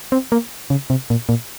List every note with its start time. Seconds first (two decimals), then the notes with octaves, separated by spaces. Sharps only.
0.12 C4
0.32 A#3
0.70 C#3
0.90 C3
1.10 A#2
1.29 A#2